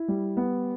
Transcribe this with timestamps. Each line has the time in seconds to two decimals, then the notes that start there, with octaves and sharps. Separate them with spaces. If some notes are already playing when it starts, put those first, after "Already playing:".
Already playing: E4
0.08 G3
0.37 B3